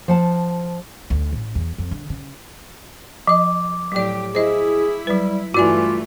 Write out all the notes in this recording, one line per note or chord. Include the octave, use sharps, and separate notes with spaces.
F3 F#5 A5
D2
A1
E2
F2
D3
C#3
F3 D#5 D6
A2 F#3 G4 D5
E4 G#4 C5 D#5
F#3 G3 B4
G2 E3 A3 F4 F#4 D5 G#5 D6